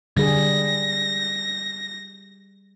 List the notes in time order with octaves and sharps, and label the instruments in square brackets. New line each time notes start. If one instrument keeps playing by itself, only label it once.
[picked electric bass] D3 [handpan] G3 G#4 [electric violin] A#6